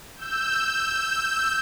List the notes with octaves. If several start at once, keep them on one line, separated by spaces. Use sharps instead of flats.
E6 G6